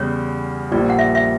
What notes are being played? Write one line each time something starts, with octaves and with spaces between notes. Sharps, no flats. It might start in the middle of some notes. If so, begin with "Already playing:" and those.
Already playing: E2 C#3 G3 C#5
A#1 A#2 G3 D5
F#5
E5
E5